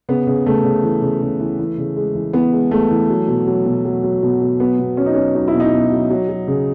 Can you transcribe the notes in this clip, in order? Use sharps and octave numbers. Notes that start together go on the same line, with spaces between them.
C#3 B3
C#3
C#3 A3
C#3
E3
C#3
C#3
E3
E3
C#3
G#3
E3
E3 B3
G#3
G#3 A3
E3
F#3
B2
F#3
B2
F#3
F#3
B2
B2
F#3 B3
B2
F#3 C#4
D#4
F#3 C#4
F#3 D#4
E4
B2
D#4
B2
F#3
F#3
F#3
C#3